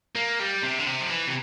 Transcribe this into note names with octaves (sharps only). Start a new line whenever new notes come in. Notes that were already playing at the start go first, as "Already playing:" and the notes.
A#3
G3
C3
D3
C3
F3
E3
C3